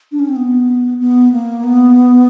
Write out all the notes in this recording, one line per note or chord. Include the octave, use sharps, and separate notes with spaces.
D4
C#4
C4
B3
B3
A#3
B3